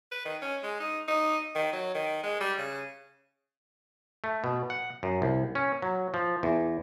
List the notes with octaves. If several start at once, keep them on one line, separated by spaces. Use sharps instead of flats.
B4
D#3
C#4
G#3
D#4
D#4
D#3
F#3
D#3
G#3
G3
C#3
A3
B2
F#5
F#2
C2
C#4
F#3
F3
E2